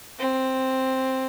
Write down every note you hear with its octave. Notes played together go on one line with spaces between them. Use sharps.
C4